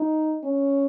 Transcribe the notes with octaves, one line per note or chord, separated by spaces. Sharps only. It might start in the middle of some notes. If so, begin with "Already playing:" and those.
Already playing: D#4
C#4